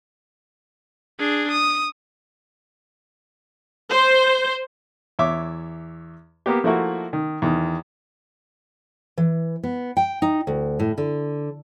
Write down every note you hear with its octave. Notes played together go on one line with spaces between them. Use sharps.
D4 G#4
D#6
C5
E2 C#5 E5 D6
A#3 B3 G4
F3 A3 A#3 E4 F#4
D#3
E2 D#3
E3
B3
G5
D#4
D2
A2
D3